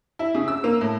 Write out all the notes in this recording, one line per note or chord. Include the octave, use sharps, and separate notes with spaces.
E4
C#3
E6
A#3
A2